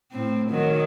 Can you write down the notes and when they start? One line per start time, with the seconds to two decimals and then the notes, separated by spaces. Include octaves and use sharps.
0.12 A2 C4
0.50 D#3 F#3